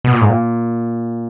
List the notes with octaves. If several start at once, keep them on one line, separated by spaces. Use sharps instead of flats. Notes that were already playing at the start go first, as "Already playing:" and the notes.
B2
A#2
G#2
A#2